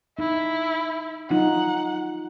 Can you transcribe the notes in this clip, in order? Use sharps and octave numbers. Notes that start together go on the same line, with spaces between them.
D#4 E4
F#3 D#4 F4 F#5